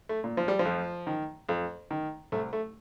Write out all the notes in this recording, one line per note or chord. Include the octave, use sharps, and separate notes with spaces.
A3
A#2
F3
G3
F3
F2
D#3
F2
D#3
C2 A3
A3